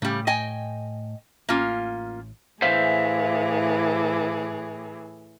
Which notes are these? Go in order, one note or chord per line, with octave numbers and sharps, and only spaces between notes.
A2 C#3 G3 A3
D#5 G5 G#5
A1 A#3 C#4 F4
A2 E3 G#4 C5 E5 F5